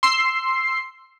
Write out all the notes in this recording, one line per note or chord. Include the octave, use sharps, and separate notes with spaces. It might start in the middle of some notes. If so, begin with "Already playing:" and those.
C6 E6 C7